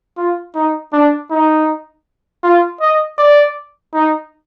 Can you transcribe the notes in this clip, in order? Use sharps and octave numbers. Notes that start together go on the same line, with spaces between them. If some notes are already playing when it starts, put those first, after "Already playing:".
F4
D#4
D4
D#4
F4
D#5
D5
D#4